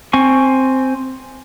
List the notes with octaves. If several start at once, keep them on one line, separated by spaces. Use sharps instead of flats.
C4 G#5 C#6